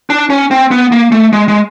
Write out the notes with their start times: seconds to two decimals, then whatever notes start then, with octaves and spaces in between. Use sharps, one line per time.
0.10 D4
0.30 C#4
0.51 C4
0.71 B3
0.92 A#3
1.12 A3
1.33 G#3
1.48 G#3